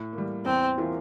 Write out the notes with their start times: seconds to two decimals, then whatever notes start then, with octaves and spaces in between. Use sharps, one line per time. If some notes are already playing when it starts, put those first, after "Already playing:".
Already playing: A2
0.13 A#3
0.18 G3
0.45 E2 C4
0.78 E3 A#3 F4 A#4